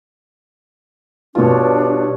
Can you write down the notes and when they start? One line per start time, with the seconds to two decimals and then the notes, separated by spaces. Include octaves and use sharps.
1.35 G2 B2 D4 F4 C#5